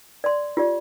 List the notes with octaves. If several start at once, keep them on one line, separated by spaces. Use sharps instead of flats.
D5 C6
F4 G4 D5